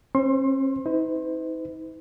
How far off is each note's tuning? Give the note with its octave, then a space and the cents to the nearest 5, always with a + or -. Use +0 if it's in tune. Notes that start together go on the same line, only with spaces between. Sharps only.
C#4 -45 C5 -15 C6 +30
D#4 +45 B4 +45